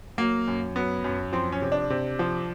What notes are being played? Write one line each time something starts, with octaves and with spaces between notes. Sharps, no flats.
F#3 A#3
F#2
F#3 B3
F#2
F3 C4
C#4
C3
D4
C3
F3